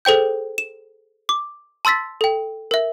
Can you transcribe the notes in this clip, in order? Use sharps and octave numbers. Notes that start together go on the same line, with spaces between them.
G#4 A4 C5 G5 G6
E7
D6
A5 C6 E6 A6 B6
A4 G5
A#4 E5